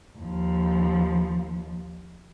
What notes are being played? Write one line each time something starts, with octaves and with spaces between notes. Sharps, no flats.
D#2 F3